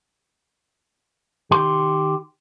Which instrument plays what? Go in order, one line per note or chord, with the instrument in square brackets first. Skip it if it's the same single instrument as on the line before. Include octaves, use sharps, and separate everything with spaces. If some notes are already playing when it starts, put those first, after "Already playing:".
[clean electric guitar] D#3 G4 C6